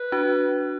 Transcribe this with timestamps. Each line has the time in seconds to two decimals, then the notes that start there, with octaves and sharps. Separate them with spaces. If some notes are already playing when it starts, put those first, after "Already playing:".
Already playing: B4
0.12 D4 F#4